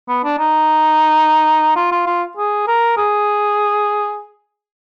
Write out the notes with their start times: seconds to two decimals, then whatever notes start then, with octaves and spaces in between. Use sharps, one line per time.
0.09 B3
0.24 D4
0.39 D#4
1.76 F4
1.92 F4
2.07 F4
2.37 G#4
2.68 A#4
2.97 G#4